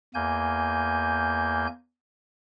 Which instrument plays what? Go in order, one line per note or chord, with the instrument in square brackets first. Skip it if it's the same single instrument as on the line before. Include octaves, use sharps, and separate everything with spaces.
[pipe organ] E2 A#3 G#5 G6